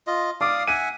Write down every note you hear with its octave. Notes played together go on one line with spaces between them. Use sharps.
F4 D#5
D5 F5 D6 D#6
E5 F#5 G#5 D#7